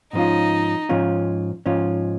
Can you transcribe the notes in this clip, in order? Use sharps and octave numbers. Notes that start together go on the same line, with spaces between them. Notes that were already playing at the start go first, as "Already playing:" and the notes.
G#2 F3 C#4 D#4 F4
G#2 F3 C#4 F4
G#2 F3 C#4 F4